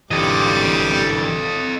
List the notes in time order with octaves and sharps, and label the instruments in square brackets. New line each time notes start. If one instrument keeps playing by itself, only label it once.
[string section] G#1 E2 D6 [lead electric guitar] D3 E3 [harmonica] G3 [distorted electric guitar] A4 D#5